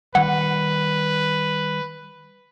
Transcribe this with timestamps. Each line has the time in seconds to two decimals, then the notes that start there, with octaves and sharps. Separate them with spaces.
0.15 D#3 G3 B4 F#5